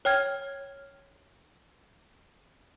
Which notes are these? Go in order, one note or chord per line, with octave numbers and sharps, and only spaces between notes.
C#5 G5 F6 G#6